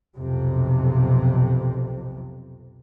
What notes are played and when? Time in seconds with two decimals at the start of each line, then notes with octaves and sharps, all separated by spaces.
0.17 B1 F2 C3